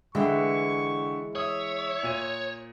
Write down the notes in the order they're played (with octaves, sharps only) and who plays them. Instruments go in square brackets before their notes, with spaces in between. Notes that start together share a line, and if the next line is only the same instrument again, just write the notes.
[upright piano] D3 E5 G5 [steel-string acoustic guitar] E3 G#3 [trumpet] C#6
[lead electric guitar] C#5 [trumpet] E5 [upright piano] D#6
[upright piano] A#2 D#7